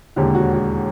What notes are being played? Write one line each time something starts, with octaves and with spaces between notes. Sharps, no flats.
E1 D#2 D3 G4
F#4
F#4